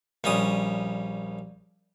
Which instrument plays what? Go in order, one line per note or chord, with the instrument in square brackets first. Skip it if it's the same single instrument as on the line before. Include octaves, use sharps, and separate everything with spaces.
[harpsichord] A#1 G3 C#4 D#6